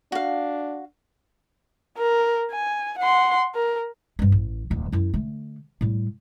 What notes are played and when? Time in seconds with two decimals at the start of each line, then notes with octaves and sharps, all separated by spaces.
0.12 D4 F#4 F5
1.98 A#4
2.51 G#5
2.99 F#5 C6
3.55 A#4
4.19 G2 C4
4.32 A1
4.70 D1 F2
4.92 F#2 E4
5.14 D3 A3
5.81 A2 G3